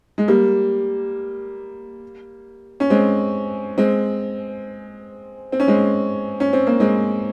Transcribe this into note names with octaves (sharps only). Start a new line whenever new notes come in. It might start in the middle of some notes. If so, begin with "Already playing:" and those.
G#3
G3 A#3
C#4
G#3 C4
G#3 C4
C4
C#4
G#3 C4
C#4
C4
A#3
G#3 C4